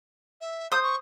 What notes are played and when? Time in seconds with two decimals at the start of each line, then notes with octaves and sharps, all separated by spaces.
0.41 E5
0.72 C5 D#6 G6
0.83 C#6